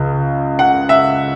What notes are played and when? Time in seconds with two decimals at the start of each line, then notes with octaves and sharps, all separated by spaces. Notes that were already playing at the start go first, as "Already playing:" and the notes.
Already playing: C#2 C#3
0.59 F#5
0.89 E5